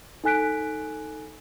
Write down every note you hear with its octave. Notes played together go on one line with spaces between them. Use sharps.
D#4 A4 G#5 F#6 B6 D7